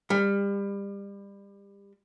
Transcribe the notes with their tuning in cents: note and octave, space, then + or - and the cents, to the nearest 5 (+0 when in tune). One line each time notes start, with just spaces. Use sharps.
G3 +30